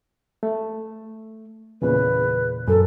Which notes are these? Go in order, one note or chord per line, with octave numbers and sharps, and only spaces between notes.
A3
E2 A#2 C#3 B4
F#2 A4